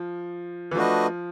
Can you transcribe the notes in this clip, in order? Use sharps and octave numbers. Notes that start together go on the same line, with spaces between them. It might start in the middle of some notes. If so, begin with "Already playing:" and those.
Already playing: F3
E3
F3 A3 D4 F#4 B4 D#5